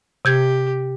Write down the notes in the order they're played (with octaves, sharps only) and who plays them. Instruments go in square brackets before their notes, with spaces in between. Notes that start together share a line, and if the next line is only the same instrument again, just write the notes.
[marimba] C3 G6 G#6 [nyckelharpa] G4